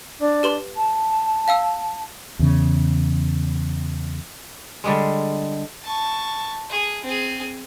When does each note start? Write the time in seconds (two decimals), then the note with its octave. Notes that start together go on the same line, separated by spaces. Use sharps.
0.19 D4
0.43 G4 B4 C6
0.76 A5
1.48 F5 F#5 E6
2.39 E2 C#3
4.84 D3 G3 G#3
5.83 A5 C#6
6.70 G#4
7.04 C4 G#4